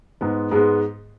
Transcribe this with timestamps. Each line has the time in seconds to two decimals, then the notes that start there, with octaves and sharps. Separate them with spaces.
0.21 G#2 G#3 B3
0.51 G#2 G#3 B3